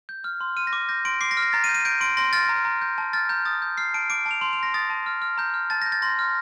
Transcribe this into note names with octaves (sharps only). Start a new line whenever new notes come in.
G6
F6
C6
F6 D#7
A#6
D6
G6 A#6
C6 D7
D6 C7
A#6
F6
A#6
A#5 A6
D#7
G6
D#7
G6 D7
C6 D7
C6 A#6
F6 A6
A#5
A#5
G6
A5
F6 A6
A#5 G6
D#6 A6
G6
F6 C7
A5 D7
D6 D7
A5
F7
C6 F7
F7
F6
A#6
D#6 A6
A5
F6
F6
A#5 G6
F6
A5 A6
A#6
G6
A6
C6 A#6
F6